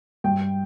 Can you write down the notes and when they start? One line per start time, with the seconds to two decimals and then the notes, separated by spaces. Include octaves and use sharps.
0.24 G2 G5